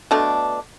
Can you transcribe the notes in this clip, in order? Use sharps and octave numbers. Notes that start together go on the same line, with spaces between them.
B2 A3 D4